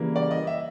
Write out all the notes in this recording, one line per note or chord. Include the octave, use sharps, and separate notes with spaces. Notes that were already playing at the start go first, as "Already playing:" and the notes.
Already playing: C#3 E3 G3 A#3
D5
D#5
E5